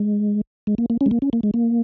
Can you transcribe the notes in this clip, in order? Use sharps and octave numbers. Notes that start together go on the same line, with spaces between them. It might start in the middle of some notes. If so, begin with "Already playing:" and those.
Already playing: G#3
G#3
A#3
A#3
C#4
G#3
A#3
C#4
A#3
G#3
A#3